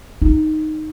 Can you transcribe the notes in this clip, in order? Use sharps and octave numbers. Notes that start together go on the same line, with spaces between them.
D#4